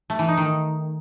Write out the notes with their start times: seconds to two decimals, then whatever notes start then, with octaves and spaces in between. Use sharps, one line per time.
0.10 A3
0.19 E3
0.28 D#4
0.37 D#3